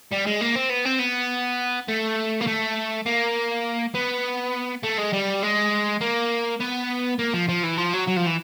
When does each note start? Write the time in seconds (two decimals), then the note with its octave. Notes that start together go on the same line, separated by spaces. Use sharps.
0.12 G3
0.26 G#3
0.41 A#3
0.56 C4
0.70 B3
0.85 C4
0.99 B3
1.89 A3
2.41 A#3
2.47 A3
3.06 A#3
3.95 B3
4.84 A3
4.99 G#3
5.13 G3
5.43 G#3
6.01 A#3
6.60 B3
7.19 A#3
7.34 F3
7.49 F3
7.63 E3
7.78 F3
7.93 F#3
8.08 F#3
8.17 F3
8.27 E3